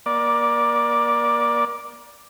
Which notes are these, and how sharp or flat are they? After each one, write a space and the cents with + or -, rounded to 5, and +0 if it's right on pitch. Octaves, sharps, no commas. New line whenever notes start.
A#3 +30 D5 +0